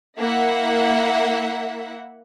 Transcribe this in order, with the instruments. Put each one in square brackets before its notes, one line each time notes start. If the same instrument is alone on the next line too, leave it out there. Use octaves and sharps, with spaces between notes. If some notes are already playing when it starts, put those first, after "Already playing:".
[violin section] A#3 E4 E5 F#5